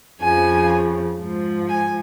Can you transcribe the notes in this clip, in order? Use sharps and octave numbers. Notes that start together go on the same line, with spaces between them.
F2 C#3 F3 G#5
G#2 F3
G#5